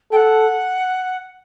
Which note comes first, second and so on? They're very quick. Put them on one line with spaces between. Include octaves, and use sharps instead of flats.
A4 G5 F#5